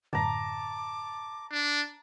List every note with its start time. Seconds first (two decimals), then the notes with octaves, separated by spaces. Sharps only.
0.13 F#2 A2 D3 A5 A#5 D6
1.52 D4